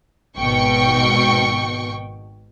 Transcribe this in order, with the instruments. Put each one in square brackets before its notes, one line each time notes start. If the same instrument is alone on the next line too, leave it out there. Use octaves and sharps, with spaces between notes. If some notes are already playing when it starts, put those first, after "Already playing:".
[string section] G#1 B2 G5 C#6 C#7